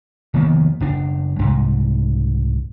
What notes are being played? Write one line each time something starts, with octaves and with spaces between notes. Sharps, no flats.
F1 D#3 A#3 B3
F#1 D4
C2 G#2